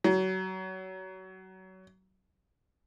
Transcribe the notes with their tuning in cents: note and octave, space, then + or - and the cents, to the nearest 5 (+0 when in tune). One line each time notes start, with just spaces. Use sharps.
F#3 +25